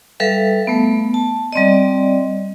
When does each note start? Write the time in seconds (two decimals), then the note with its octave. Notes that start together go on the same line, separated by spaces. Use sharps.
0.20 G3 A4 B4 E5 F5
0.67 A3 B3
1.14 A5
1.53 G3 C4 D5 D#5